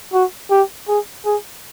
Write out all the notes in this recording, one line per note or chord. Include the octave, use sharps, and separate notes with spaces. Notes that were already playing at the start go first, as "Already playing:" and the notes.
F#4
G4
G#4
G#4